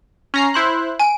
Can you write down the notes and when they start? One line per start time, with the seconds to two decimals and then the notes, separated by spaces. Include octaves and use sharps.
0.34 C#4 A#5 C7
0.54 E4 C5 F#6
0.99 G#5 D7